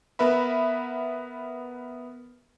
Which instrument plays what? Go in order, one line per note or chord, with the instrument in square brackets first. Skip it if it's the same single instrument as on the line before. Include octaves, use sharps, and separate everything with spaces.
[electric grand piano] B3 A#4 B4 E5 B5